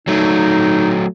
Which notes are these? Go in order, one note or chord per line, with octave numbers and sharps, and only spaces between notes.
F#3 A3 D#4